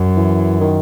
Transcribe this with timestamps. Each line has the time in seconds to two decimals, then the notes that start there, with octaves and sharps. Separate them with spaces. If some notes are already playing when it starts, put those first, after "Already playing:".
Already playing: F#2
0.16 E3
0.61 D#3